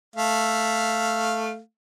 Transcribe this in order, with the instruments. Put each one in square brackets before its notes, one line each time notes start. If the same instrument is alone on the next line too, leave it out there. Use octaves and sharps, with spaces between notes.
[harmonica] A3 F5